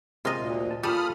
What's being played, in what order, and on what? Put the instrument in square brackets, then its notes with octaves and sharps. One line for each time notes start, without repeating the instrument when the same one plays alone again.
[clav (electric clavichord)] C3 G#3 A#3 [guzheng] F4 D#5
[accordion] D2 [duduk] A#2
[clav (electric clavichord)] A5
[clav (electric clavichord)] A#2 G4 [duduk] F4 [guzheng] A4 [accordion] B5 D#6 F6